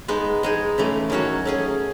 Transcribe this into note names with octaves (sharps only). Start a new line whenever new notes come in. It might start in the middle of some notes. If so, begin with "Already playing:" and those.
G#3 B3 D#4
G#3 D#4 G#4
C#3 E3 A3
D#3 F#3 C#4 F#4
A3 C#4 G#4